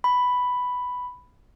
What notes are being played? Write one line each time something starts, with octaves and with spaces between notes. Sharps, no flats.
B5